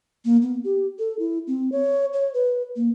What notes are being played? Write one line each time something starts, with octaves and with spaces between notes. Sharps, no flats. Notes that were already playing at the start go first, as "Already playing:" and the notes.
A#3
B3
G4
A4
E4
C4
C#5
C#5
B4
A#3